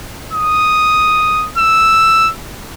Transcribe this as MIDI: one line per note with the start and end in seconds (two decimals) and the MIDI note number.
0.33 1.48 87
1.58 2.31 88